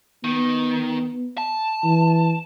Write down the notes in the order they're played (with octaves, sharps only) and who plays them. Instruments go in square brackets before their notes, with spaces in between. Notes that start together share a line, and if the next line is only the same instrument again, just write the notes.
[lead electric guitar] D#3 [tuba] B3
[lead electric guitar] A5
[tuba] E3